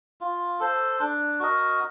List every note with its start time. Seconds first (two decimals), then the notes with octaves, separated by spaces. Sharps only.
0.21 F4
0.60 A4 C5
1.00 D4
1.40 F#4 A#4 D#5